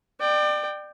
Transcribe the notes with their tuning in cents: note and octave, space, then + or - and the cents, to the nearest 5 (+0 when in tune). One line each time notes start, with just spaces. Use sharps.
D5 +30 G5 -5